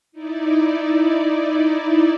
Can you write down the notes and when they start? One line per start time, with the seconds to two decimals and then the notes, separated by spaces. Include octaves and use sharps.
0.12 D#4 E4 D5